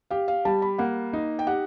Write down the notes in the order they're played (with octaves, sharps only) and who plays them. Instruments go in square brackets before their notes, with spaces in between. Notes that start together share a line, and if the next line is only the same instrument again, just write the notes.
[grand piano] G4 [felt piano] F5
[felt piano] F5
[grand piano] G3 [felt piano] A5
[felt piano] B5
[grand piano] A#3 [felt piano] F#5
[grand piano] D#4
[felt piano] G5
[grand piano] G4 [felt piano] F#5